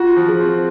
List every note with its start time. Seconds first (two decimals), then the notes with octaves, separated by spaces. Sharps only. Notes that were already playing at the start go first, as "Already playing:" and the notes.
Already playing: F4 F#4
0.16 F3
0.29 G#4
0.40 C4